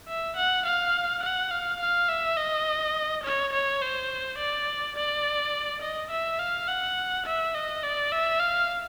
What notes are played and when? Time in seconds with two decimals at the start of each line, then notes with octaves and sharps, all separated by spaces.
0.08 E5
0.36 F#5
0.66 F5
1.23 F#5
1.51 F5
1.80 F5
2.09 E5
2.37 D#5
3.24 C#5
3.53 C#5
3.82 C5
4.38 D5
4.96 D5
5.82 D#5
6.10 E5
6.39 F5
6.68 F#5
7.26 E5
7.54 D#5
7.83 D5
8.12 E5
8.40 F5